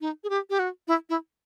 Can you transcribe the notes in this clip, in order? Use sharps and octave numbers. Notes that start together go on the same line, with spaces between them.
D#4
G#4
G4
G4
F#4
E4
E4